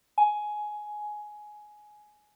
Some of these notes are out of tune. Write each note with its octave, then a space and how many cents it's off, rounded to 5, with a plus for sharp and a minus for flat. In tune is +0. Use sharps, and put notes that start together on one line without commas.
G#5 +15